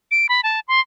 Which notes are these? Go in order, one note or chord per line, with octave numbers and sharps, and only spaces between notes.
D7
B5
A5
C6